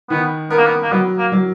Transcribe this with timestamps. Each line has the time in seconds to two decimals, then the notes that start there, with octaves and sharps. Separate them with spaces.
0.10 D#3 B3
0.50 B3 A#4
0.58 A#3
0.66 B3
0.82 A#3
0.92 F#3 B3
1.18 A#3
1.32 F#3